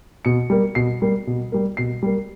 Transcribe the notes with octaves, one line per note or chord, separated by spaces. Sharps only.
B2 C#7
G3 A#3
B2 C7
G3 A#3
B2
G3 A#3
B2 C7
G3 A#3